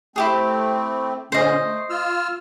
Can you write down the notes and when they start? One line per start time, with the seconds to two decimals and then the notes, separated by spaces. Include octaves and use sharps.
0.16 A3 C4 E4 G4 G#4
1.32 A#2 D3 C#4 C5 D#5
1.63 A3
1.89 F4 E6 F6